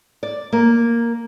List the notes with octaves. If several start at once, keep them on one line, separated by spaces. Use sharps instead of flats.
D5
A#3